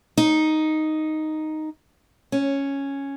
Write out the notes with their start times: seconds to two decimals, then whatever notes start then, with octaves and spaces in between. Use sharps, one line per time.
0.17 D#4
2.32 C#4